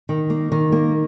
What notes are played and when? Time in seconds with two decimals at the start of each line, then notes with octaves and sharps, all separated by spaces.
0.09 D#3
0.30 A#3
0.52 D#3
0.72 A#3